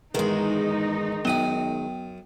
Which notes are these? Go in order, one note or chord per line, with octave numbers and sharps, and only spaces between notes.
E2 G#2 D#3 G#3 D#4
F#2 B3 G5 D#6